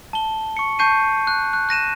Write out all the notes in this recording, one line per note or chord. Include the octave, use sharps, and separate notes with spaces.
A5 G7
C#6 C#7
A5 C#6 G6 C7 D#7
F#6
F#6
F#6 A#6 D#7 E7